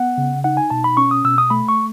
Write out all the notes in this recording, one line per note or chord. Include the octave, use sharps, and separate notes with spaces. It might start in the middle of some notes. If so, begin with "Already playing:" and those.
Already playing: B3 F#5
C#3
D#4 F#5
G#5
B2 A5
B5
C#4 C#6
D#6
B2 E6
D#6
A3 B5
C#6